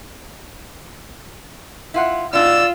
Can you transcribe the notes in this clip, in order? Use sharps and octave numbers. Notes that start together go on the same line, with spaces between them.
E4 F4 F#5
B2 D4 D#4 F4 D5 E6